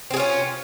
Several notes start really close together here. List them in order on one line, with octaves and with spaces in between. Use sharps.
C4 G#4 F4 C#4